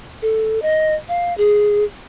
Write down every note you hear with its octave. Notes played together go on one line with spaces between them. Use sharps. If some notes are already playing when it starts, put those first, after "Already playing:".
A4
D#5
F5
G#4